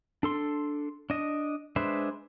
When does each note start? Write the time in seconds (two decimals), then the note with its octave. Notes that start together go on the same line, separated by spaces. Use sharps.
0.23 D4 A4 C6
1.10 D4 D#5
1.76 G#3 D4 B4 C5 E5